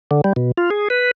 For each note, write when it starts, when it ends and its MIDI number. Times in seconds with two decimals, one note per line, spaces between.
0.11 0.21 50
0.24 0.33 55
0.36 0.51 47
0.57 0.70 65
0.70 0.88 68
0.90 1.11 71